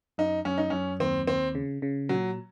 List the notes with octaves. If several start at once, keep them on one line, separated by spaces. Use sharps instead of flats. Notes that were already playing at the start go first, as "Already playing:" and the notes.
F#2 D#4
F#2 C#4
D#4
F#2 C#4
D#2 C4
D#2 C4
C#3
C#3
A#2 F#3